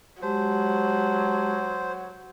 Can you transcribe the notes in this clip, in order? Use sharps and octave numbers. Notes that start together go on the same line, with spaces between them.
F#3 G#3 G4 C5 A5